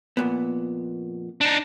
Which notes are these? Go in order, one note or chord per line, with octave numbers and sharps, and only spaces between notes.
F2 A#2 B3
D4 D#4